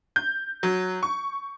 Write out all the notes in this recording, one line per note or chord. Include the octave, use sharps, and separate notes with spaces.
G6
F#3
C#6